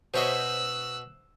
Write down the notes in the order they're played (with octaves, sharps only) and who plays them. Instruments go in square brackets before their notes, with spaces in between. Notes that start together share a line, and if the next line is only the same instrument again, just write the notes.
[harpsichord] B2 F#4 D#5 [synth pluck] C5 C#5 E5 [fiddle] E6 F#6